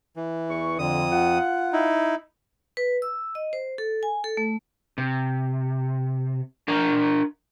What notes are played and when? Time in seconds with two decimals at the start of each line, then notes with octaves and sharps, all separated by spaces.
0.16 E3
0.49 E2 C#6
0.79 F2 D3 D#6
1.11 F4 F#5
1.73 D#4 E4
2.77 B4
3.02 E6
3.35 D#5
3.53 C5
3.78 A4
4.03 G#5
4.24 A4
4.37 A3
4.98 C3
6.68 D4 A#4 A#5